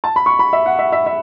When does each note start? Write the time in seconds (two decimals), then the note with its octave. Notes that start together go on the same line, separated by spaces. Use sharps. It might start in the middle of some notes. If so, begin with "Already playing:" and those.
0.04 A5
0.16 B5
0.26 C#6
0.39 B5
0.53 E5
0.66 F#5
0.79 E5
0.92 E5
1.06 E5